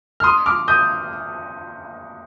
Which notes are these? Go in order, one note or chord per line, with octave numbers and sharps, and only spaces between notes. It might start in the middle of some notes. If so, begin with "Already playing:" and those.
F6
C6 D#6
D6 F6
D#6 G6